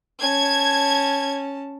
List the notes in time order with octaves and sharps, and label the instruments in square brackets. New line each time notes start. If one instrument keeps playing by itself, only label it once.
[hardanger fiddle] C#4 A5 [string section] G#6